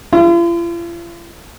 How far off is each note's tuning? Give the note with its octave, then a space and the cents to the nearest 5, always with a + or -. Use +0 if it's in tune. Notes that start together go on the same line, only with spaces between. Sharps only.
F4 -45